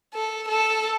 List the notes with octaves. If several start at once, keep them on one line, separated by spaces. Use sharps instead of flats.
A4
A4